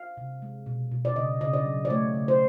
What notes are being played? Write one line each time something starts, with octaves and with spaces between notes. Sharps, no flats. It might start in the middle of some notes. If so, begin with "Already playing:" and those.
Already playing: F5
C3
G#3
B2
B2
D5
C#3 D#5
C#3 D#5
D5
F#3
D5
A3 C#5
C#3
C5